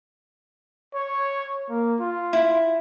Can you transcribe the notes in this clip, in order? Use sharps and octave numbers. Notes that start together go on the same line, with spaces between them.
C#5
A#3
F4
E4